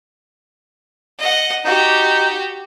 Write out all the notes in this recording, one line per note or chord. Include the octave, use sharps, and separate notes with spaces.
D#5 F#5
D#4 F#4 G4